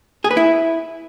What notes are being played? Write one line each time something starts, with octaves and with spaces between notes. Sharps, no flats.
G#4
B4
E4